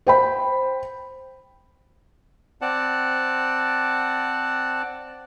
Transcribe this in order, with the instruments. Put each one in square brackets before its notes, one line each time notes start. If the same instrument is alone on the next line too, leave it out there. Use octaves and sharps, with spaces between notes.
[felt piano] C5 G5 B5
[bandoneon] C4 D5 F#5 A5